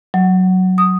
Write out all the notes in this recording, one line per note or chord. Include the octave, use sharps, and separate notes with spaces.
F#3
D#6